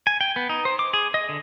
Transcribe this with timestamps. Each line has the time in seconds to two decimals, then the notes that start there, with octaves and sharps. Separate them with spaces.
0.07 G#5
0.21 G5
0.36 B3
0.49 D#4
0.65 C5
0.79 D6
0.94 G#4
1.14 D#5
1.29 D3